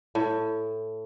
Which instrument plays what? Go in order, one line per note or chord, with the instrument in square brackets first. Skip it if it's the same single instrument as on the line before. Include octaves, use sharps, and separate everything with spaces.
[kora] A2